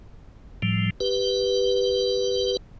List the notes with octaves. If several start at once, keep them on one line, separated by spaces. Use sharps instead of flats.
A2 F3 G3
G4 B4